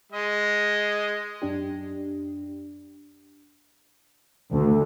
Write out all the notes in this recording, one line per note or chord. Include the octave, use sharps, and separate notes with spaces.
G#3 D#5
F#2 D4 G4
D2